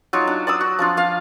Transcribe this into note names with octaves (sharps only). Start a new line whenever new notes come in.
F#3 D#4 F4
D4
D5 D#6 E6
F#4
F3 D4 F4
F4 F5